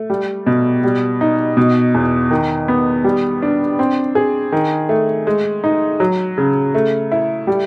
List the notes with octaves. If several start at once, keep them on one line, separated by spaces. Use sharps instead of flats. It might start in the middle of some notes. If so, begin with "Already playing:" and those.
Already playing: A3
G3
B2
G3
D#4
B2
E2
D#3
B3
G3
D4
C4
G#4
D#3
A3
G#3
D#4
F#3
C#3
A3
E4
G3